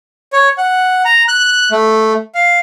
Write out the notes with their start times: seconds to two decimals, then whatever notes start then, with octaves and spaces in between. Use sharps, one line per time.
0.33 C#5
0.58 F#5
1.05 A#5
1.28 F#6
1.71 A3
2.35 F5